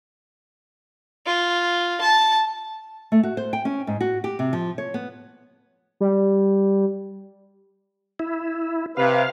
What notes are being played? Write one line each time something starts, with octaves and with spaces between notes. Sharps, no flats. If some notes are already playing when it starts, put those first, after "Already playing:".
F4
A5
A3
F#4
C5
G5
C#4
G#2
F#4
G4
C3
F3
C#5
B3
G3
E4
C3 B4 F5